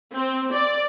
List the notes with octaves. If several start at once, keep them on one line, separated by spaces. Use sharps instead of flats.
C4
D5